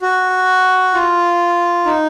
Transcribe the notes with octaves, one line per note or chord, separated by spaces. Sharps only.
F#4
F4
D#4